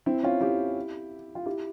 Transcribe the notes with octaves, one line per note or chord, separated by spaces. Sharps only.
C4 E4
C#4 F4
E4 G4
F4
E4 G4